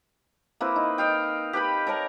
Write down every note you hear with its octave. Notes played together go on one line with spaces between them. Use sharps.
A#3 C4 E4 B4
D#4
D#5 F5 G5
G4 B4 G5 B5
A#4 C#5 A5 A#5